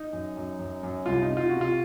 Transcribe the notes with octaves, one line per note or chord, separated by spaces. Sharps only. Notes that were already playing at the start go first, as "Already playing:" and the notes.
Already playing: D#4
F#2
F#2
F#2
F#2
C2 F4
D#4
C3
F4
C3 F#4
F4